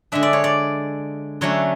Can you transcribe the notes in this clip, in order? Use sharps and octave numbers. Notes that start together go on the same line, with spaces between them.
D3 G#3 D4 E5
D5
C#5
D5
D3 F#3 A3 C#4 C#5